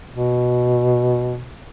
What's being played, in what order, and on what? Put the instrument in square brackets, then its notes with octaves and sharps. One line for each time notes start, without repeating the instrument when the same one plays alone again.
[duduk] B2